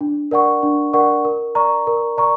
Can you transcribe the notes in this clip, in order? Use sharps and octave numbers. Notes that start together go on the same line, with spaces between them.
D4
A#4 D5 F#5 C#6
D4
A#4 D5 F#5 C#6
A#4
D5 A#5 C#6
A#4
D5 A#5 C#6